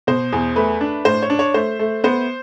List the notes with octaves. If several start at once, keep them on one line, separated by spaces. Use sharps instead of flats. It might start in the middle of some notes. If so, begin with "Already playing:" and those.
B2 C5
E2
A3 B4
D4
A2 C5
C#5
D4
C#5
A3 C5
A3
B3 C5